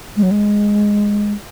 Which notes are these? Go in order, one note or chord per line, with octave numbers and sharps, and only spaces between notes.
G#3
F#3
G#3